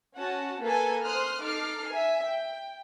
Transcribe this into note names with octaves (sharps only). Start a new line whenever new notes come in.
C#4 F#4 F#5 A5
A#3 A4 B4 G#5 A5
C5 C6 D#6 F6 F#6
D#4 A4 D6 F6 C7
E5 G#5
G5